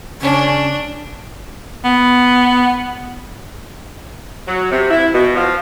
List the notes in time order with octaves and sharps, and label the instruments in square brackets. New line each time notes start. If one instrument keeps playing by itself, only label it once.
[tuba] C#3 [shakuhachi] C#4 [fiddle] D4
[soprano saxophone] B3
[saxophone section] F#3
C3
E4
B2
F3